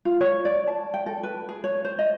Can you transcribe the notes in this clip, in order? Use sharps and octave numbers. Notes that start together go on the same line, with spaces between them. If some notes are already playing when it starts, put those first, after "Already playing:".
F4
C#5
D5
A5
G5
A4
B4
G#4
C#5
C5
D#5